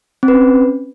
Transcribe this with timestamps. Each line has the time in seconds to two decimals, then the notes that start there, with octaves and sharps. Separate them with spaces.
0.23 C4
0.28 B4
0.34 C#4